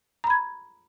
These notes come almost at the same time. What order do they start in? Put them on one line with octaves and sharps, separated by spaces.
A#5 B5 G#6